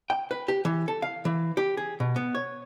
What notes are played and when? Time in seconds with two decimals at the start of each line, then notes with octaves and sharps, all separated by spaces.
0.10 G5
0.31 B4
0.48 G4
0.65 E3
0.88 A4
1.02 F5
1.25 E3
1.57 G4
1.77 G#4
2.00 B2
2.16 B3
2.35 C#5